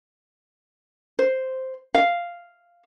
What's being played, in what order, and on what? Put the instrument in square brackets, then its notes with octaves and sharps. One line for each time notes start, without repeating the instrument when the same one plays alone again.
[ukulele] C5
F5